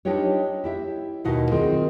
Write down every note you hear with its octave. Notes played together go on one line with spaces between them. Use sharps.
D4 D#4 F4 G4 B4 C#5
E4 G4 E5
D#2 B2 D#4 E4 F#4 F5
D#3 C4 F4 G#4